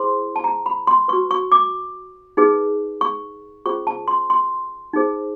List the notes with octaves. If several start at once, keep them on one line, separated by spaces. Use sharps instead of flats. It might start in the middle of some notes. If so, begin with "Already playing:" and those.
Already playing: E4 G#4 C5 C6
A5
A#5
B5
C6
F#4 B4 C#6
C#6
D6
D#4 G#4 B4
C#6
C#4 F4 G#4 C5 C#6
A5
C6
C6
D#4 G#4 C5